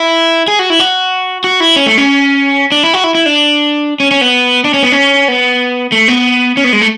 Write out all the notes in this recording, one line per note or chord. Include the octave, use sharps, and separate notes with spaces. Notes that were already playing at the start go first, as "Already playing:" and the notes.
Already playing: E4
G#4
F#4
E4
F#4
F#4
E4
C#4
A3
C#4
D4
E4
F#4
E4
E4
D4
C#4
C#4
B3
D4
C#4
B3
C#4
B3
A3
B3
C#4
B3
G#3
A3